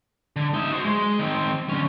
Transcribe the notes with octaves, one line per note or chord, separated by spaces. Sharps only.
D3
D#4 E5
F#4 C5
G#3
D#3 C4
D3 C#4